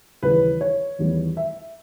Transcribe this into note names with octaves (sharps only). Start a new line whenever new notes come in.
D#2 C#3 E3 G3 B4
C#5
E2 D#3 G3 B3
E5